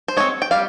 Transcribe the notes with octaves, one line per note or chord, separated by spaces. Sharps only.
C5
G#3 C4 C#5
G5
G3 F5